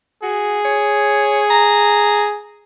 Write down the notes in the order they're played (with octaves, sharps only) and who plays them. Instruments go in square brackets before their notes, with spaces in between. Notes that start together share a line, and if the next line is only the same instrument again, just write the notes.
[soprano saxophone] F#4 [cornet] G#4
[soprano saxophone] C#5
A#5